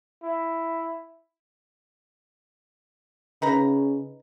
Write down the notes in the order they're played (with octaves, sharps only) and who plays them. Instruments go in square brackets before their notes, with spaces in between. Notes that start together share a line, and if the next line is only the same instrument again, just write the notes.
[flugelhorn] E4
[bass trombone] C#3 [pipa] D#4 B4 A#5